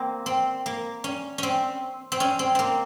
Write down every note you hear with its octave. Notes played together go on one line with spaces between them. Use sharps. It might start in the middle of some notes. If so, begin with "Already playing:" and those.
Already playing: A#3 C4
C4
A#3
C#4
C4 C#4
C4
C#4
C4
A#3 C4